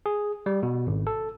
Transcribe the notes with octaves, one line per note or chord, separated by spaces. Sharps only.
G#4
G3
B2
G#1
A4